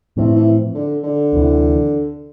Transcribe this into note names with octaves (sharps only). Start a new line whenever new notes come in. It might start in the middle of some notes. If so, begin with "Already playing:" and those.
A2 E3 F3 C4
E3
D3
D3
D2 C3 E3